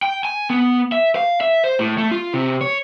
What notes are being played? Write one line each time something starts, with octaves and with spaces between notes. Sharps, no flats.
G5
G#5
B3
E5
F5
E5
C5
A2
A3
F4
C3
C#5